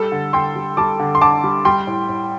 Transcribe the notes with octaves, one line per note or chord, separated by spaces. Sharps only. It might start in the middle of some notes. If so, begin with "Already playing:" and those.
Already playing: G3 A4
D3
D3 G5 C6
G3
G3 A5 D6
D3
C6
D3 A5 D6
G3
G3 G5 C6
A2
A2